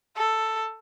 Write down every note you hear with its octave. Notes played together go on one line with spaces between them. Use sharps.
A4